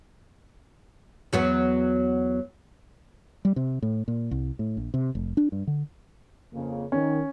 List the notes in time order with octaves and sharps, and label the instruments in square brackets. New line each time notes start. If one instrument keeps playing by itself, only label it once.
[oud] E2 F#3 B3
[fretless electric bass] G3
C3
A2
A#2
C2
A2
A#1
C3
F1
D4
G2
D3
[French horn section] F2 C#3 A#3
[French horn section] D#3 [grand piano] C#4